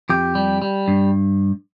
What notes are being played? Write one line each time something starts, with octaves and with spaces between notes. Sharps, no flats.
F2 G4
G3
G3
G2